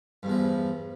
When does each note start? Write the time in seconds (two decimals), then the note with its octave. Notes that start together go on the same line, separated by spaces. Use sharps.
0.23 G2
0.26 E2
0.29 F3